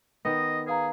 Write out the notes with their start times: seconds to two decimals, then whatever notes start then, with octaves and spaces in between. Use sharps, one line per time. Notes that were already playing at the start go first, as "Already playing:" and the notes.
0.25 D#3 B3 D#5
0.67 G#4 B4 F5 A#5